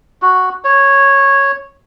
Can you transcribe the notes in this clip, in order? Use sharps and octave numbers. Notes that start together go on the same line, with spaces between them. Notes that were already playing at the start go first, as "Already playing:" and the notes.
F#4
C#5